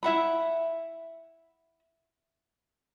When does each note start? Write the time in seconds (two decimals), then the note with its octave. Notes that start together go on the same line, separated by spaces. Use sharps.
0.03 E4 E5 F#5 B5